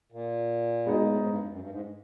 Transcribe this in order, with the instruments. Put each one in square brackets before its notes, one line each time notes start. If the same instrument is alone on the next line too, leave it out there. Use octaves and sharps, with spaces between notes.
[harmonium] A#2
[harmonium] B2 [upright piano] G#3 B3 D#4
[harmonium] A#2
A2
G#2
G2
F#2
F#2
G2
G#2